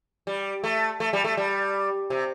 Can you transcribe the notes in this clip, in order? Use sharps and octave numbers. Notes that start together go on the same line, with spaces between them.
G3
A3
A3
G3
A3
G3
C3